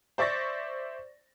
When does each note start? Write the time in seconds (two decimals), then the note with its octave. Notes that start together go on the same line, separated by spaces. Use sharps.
0.18 C5 D5 E5 C#6 A6 A#6